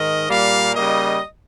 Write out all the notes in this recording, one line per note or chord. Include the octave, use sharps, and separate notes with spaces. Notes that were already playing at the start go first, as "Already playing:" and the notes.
Already playing: G#2 D#3 D#5
A#2 G3 A#3 F5
C#3 G3 A#3 D#5